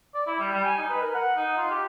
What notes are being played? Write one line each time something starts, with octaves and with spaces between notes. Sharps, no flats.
D5
E4
G3
G3
G#5
D#4
B4
A#4
F#5
D#4
F4
G4